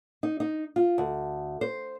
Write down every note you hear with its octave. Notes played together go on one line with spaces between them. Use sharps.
D#4
D#4
F4
D2
C5